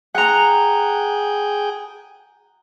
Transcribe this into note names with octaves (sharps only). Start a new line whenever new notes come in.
G#4 F#5 G5 A#5